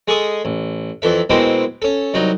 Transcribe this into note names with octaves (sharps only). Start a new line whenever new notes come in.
G#3 G#4 A4 C#6 D#6
A1
F2 E3 A4 E5
B2 G#3 A#3 C4 E4
C#4 A4
C2 F#3 D#4